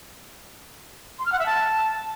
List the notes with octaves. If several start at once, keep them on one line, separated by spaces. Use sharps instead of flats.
C6
F6
F#5
E5
A5